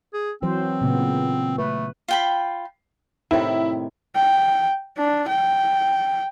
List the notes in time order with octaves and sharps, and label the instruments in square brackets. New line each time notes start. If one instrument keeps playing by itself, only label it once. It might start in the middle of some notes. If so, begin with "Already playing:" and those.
[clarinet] G#4
[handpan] E3 F#3 C5 [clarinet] C4
[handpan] A#2 C#3 B3
[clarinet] A3 [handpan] B4
[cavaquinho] F4 G5 B5
[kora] A2 C3 D#3 [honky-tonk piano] E4
[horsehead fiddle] G5
D4
G5